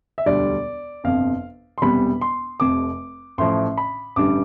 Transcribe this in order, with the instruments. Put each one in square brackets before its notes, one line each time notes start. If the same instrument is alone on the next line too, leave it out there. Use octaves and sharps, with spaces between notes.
[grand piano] E5
E1 D2 D3 G3 D5
G1 F2 C3 F5
C6
E1 E2 C3 G3 B5
C6
F1 F2 C3 D6
A1 A2 F3 C6
B5
A1 G2 D3 G3 D6